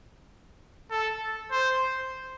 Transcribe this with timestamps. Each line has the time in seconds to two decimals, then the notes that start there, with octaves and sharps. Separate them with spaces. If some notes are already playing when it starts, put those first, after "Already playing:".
0.90 A4
1.51 C5